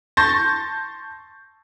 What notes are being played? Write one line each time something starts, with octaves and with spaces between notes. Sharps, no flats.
A5 C6 C#6 G6 A6 A#6